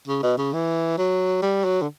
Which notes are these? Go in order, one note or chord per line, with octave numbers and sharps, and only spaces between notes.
C#3
B2
C#3
E3
F#3
G3
F#3
D3